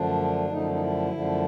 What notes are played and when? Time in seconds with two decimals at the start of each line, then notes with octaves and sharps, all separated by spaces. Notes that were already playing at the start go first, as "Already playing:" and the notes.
Already playing: F#2 D3 F3 A3 D4
0.49 F#2 D3 F3 A3 D#4
0.71 D#4
0.80 E4
1.12 F#2 D3 F3 A3